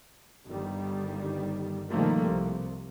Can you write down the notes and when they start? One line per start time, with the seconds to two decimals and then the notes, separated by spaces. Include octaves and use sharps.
0.45 G1 G2 D#3 G3
1.89 B2 D#3 F3 G3 A3 A#3
2.25 C2 C3